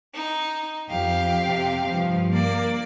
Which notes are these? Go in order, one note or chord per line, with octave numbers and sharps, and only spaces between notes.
D#4
F2 G4 F5
C3
G2 F3
A#3 D5